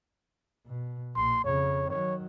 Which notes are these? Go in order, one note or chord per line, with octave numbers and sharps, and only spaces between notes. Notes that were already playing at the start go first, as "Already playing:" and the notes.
B2
A#1 C6
F2 C#3 C#5
D#3 F#3 C#5